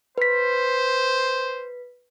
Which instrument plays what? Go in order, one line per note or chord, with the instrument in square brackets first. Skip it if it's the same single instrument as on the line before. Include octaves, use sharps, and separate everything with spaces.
[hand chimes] B4 B6 [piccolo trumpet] C5